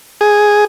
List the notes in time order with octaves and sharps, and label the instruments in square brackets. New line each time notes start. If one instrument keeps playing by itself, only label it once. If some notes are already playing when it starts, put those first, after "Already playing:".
[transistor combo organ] G#4